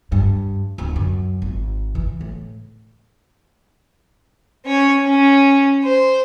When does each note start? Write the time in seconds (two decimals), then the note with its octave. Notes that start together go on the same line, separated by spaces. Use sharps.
0.12 G2
0.78 D1
0.96 F#2
1.42 G#1
1.95 E3
2.21 A2
4.66 C#4 C#5
5.05 C#4
5.83 C5